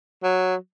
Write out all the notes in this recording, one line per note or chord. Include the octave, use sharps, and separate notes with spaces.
F#3